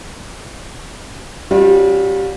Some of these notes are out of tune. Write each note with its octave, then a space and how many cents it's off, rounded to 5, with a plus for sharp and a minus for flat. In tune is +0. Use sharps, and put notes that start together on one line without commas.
G3 -10 C#4 +0 F4 +45